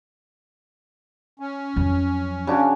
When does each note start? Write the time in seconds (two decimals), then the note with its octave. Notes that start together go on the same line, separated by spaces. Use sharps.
1.40 C#4
1.76 F2 F#3
2.47 C#3 D4 F#4